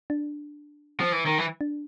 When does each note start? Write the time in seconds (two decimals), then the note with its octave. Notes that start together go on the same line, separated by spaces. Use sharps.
0.10 D4
1.00 F3
1.12 E3
1.26 D#3
1.38 E3
1.61 D4